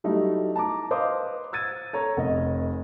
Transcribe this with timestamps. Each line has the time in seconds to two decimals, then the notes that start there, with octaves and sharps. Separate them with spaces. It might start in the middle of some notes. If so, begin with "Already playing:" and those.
0.04 F#3 G3 A3 D#4 E4
0.56 A5 A#5 D6
0.91 B4 C5 D#5 F5 D6 D#6
1.53 E6 G#6 A6 D#7
1.93 A4 C#5 A#5
2.17 F1 D#5